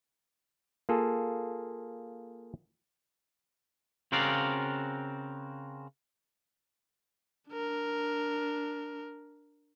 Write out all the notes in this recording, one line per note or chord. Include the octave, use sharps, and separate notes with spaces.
A#3 F4 G#4 A4
C#3 C4 F#4 A#4 D5 F5
D4 A#4